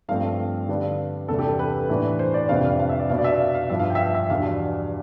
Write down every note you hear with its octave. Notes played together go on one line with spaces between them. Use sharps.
G2 F3 A3 C4 F5
D3 G3 B3 D4
E2 C3 G3 D4 A4
G4
A4
B4
A2 E3 B3 D4
C5
D5
F2 C3 G3 B3 D4 F5
F5
F5
E5
D5
B2 B3 D4 F5
D5
E5
F5
F5
G2 F3 B3 D4 E5
F5
G5
E5
F5
E5
E2 B2 G3 D4 F5